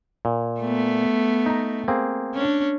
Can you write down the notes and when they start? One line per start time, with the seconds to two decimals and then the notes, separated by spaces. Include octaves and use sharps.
0.25 A#2
0.60 A3 B3
1.46 D#4 A#5
1.88 A#3 C4 G#4
2.34 C#4 D4